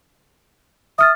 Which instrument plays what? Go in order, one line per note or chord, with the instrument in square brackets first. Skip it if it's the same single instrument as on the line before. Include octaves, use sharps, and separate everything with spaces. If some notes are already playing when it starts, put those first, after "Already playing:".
[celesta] E5 F6 A6 [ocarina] D#6